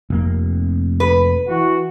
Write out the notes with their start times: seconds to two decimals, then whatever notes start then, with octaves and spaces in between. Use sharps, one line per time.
0.10 F1 A#3
1.00 B4
1.48 E3 F#4